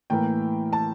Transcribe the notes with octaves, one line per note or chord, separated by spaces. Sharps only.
A2 E3 A#3 G5
A5